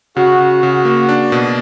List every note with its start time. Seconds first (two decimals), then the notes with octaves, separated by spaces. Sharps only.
0.16 C#3 F#4
0.40 C#3
0.63 C#3
0.85 A#3
1.09 D4
1.32 B2